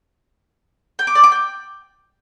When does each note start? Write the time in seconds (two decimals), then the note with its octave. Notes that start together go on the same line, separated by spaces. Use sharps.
0.99 G5
1.07 D6
1.15 D5
1.24 D6
1.32 G5